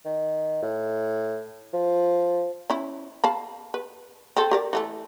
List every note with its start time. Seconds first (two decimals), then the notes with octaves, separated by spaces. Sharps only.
0.05 D#3
0.62 A2
1.73 F3
2.70 C#4 E4
3.24 F5 A5 B5
3.74 B4
4.36 C4 A4
4.51 G4 A#4 D5
4.73 E3 A3 A4